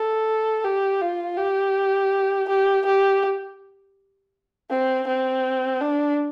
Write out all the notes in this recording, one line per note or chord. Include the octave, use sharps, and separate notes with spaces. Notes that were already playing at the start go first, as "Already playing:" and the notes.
Already playing: A4
G4
F4
G4
G4
G4
C4
C4
D4